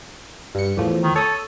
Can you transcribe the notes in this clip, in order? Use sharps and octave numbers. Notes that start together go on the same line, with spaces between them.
G2 C#7
E2 A2 F3
D#3
A4 C#5 D#6